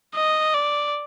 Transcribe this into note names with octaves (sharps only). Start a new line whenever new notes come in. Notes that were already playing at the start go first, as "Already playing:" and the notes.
D#5
D5